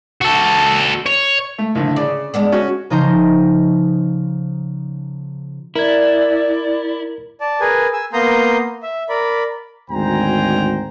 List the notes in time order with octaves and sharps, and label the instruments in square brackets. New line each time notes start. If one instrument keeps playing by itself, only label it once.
[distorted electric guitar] F#4 A4
C#5
[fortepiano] A3
A#1 A2 D3
[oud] C#3 [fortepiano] D5
[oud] G#3 B3 D4
[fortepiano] C#4 F#4
[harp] C#3 F3 D#4 C5 A#5 C6
[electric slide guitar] E4 [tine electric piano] A#4 G#6 [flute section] D5
[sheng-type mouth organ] D5 A5
G#4 A#4 B4 G#5
G#5 E6
A#3 B3 A#5 C6 D#6 G6
E5
A#4 D5 B5
[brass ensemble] G#1 D2 C5 G5 G#5 A#5